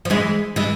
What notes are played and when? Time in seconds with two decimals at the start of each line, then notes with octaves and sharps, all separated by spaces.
0.05 F3
0.10 E3 G#3
0.56 E3 G#3